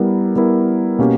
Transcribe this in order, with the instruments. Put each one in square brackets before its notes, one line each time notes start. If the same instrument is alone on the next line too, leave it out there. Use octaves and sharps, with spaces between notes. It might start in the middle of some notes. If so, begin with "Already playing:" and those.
Already playing: [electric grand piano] G3 B3 E4 A#4
G3 B3 E4 A#4
B2 A#3 C#4 G4